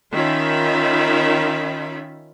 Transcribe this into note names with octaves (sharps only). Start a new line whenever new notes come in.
D#3 C#4 F4 E5 B5